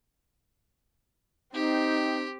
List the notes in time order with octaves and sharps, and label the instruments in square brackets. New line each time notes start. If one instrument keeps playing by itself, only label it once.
[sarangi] C4 [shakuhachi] D#4 [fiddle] G4